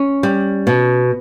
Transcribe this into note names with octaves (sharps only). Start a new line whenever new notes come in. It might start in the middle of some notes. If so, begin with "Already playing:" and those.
Already playing: C#4
G3
B2